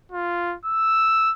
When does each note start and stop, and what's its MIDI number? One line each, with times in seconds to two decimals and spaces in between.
0.12 0.56 65
0.65 1.33 88